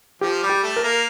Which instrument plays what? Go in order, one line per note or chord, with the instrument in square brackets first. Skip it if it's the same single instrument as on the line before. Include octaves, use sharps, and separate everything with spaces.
[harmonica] F3 [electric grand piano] G4
[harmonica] G3
[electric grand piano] G4
[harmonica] A3
[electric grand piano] A#4
[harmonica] A#3